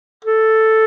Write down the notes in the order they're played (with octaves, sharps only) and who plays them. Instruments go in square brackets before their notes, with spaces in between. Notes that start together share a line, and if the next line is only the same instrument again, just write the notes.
[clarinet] A4